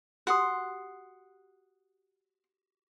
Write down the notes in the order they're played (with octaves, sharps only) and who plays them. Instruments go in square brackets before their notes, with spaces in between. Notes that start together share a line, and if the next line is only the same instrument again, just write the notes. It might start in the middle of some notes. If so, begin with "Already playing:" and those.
[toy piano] F#4 G4 D#6 [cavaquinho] F#5 C6